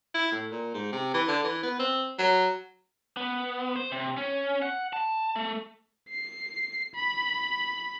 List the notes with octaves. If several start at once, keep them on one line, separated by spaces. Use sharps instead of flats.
E4
A2
A#2
G#2
C3
E3
D3
E3
B3
C4
F#3
B3
C5
C3
C#4
F#5
A5
A3
C7
B5